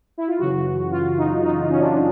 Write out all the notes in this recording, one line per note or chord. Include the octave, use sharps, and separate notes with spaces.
E4
F4
F#2 C#3 E3 F#4
F#4
F4
D#4
D#4
C#4
D4
C#4